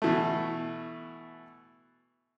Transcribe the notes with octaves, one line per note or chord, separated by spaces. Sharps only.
B2 E3 A3